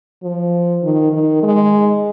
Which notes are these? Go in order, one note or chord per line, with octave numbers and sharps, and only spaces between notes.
F3
D#3
D#3
G#3